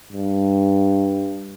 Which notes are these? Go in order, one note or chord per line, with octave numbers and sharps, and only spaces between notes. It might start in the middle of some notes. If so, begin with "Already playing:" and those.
G2